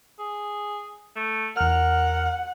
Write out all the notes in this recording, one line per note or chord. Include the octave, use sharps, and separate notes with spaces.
G#4
A3
E2 A#4 F#5 F6